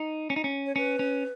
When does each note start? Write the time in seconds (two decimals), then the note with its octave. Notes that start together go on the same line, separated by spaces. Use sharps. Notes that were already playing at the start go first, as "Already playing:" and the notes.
Already playing: D#4
0.30 C#4
0.36 D#4
0.44 C#4
0.66 C#5
0.76 C#4 B4
0.99 C#4